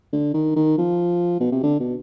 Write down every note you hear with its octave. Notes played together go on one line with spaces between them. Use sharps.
D3
D#3
D#3
F3
B2
C3
D3
B2